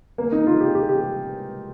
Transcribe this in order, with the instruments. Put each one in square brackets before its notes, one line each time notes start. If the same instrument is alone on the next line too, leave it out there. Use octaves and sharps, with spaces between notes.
[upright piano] A#3
D#4
F4
G4
G4
G4